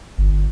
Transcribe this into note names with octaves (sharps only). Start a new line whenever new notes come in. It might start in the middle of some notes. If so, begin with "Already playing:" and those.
G1